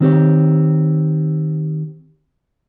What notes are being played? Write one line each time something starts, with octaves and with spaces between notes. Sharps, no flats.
D#3 C4 G4 C#5